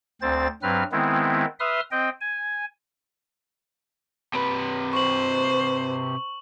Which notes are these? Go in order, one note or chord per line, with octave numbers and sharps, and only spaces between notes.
D2 C4 C5 A6
G2 F#3 C4 B4 F6
D#3 G#3 B3 C4 E4
B4 E5 C6 D#6 F6
C4 D#5 G5
G#5
C3 B4
C5 C#6 F#7